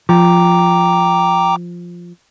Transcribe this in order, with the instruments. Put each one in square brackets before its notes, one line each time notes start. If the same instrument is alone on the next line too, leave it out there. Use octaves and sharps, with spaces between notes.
[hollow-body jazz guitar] F3 [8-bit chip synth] G5 A#5 D6